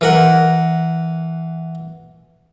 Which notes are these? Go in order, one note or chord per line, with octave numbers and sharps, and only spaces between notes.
E3 A#4 F#5